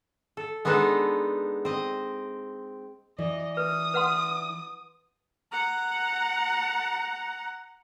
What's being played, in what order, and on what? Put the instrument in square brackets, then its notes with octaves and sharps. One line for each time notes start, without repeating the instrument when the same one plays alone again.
[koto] A4
G#3 B3 D4 D#4 A4 B4
C4 D#5
[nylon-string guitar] E3 D5 [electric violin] D#5
[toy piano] B4 [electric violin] D#6
[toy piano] B4 F#5 C6
[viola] F#5 A#5